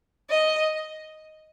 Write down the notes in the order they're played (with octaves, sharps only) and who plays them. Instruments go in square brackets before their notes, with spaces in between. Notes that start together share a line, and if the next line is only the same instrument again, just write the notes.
[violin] D#5